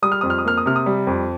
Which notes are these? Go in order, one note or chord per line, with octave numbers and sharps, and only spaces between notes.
G3 D#6
F6
F2 D#6
F6
D#6
A#3 F6
D#6
C3 F6
D#6
G3
F2